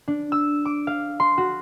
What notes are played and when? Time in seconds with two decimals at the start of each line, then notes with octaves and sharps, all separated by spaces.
0.08 D4
0.32 E6
0.65 D6
0.87 F5
1.20 C6
1.38 F#4